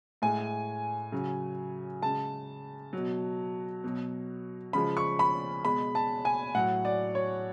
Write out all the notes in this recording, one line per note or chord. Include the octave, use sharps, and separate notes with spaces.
A2 G#3 G#5
C#3 F#3
C#3 G#3 A5
B2 F#3
B2 F#3
C#3 F3 G#3 B5
C#6
B5
B2 G#3 B5
A5
G#5
A2 F#3 F#5
D5
C#5